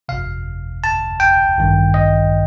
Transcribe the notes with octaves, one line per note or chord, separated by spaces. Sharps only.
G1 F2 C3 F5
A5
G5
A1 G2 D#3
D#5